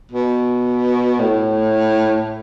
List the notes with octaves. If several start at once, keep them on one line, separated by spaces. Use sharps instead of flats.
B2
A2